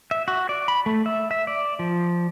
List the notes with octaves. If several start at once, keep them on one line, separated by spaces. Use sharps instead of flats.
E5
F#4
D5
B5
A3
E5
E5
D5
F3